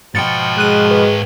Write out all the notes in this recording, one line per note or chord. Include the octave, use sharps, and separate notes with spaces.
G#2 B2 F3 G5 A6 C#7
G#3 F#6 D#7
B4